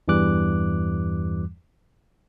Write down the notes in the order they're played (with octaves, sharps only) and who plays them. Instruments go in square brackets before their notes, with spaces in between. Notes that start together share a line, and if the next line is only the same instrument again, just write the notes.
[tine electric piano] E2 G2 E3 G3 D6 F#6